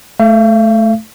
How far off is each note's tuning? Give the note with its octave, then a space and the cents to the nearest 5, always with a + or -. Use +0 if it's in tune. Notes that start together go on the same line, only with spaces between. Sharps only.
A3 -15 F5 -45